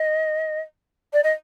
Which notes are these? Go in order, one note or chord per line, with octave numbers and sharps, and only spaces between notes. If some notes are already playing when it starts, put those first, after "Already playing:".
Already playing: D#5
D5
D#5